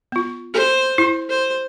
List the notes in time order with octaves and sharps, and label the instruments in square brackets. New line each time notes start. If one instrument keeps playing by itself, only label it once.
[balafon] B3 F4
[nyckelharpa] C5
[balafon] E4
[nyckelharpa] C5